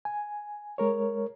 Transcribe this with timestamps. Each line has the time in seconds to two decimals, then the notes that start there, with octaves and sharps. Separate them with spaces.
0.05 G#5
0.78 G#3 A#4 C#5